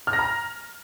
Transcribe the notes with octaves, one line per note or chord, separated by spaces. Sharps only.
F6
A#6
A#5